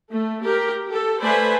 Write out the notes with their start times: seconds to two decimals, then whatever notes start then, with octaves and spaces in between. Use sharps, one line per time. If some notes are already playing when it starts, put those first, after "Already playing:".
0.11 A3
0.43 G4 A#4
0.88 G4 A4
1.21 A3 B4 C5 D5 G#5 B5